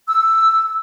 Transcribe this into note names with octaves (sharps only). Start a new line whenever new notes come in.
E6